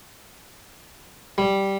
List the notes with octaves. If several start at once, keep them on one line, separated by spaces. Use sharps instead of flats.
G3